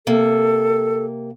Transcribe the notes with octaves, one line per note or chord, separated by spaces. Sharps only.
C3 A#3 A4